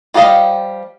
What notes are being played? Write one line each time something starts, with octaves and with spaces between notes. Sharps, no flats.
F3 G3 F4 D#5 F5